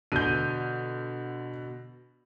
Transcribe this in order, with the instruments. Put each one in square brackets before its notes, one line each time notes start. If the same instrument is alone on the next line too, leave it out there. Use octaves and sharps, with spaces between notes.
[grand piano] B2 [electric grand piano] D3 [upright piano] G6 D#7